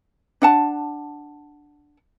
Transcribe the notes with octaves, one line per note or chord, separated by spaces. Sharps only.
D4 F#5 A5